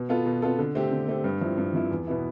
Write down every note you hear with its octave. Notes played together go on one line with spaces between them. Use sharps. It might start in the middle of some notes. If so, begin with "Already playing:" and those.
Already playing: B2
B3 F4 A4
B2
B3 F4 A4
D3
A3 C4 G4
D3
A3 C4 G4
G2
F3 C4 E4
G2
F3 C4 E4
E2
B2 B3 E4